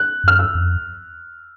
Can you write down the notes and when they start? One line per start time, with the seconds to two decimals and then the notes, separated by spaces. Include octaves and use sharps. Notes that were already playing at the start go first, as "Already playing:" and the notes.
Already playing: F#6
0.24 F#2 F6
0.39 E6
0.55 F2